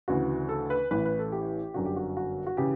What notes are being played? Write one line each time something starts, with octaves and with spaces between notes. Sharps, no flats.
D2 C#3 E3 F#4
A4
B4
A1 A2 E3 B4
B4
A4
G4
G1 F#2 D3 F#4
G4
F#4
F#4
F#4
C#3 E3 G4